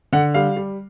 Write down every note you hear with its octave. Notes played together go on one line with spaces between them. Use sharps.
D3 F#5
G3 F5
G3